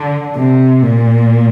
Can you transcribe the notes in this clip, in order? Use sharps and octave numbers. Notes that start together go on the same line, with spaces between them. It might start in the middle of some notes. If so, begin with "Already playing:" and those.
Already playing: D3
C3
A#2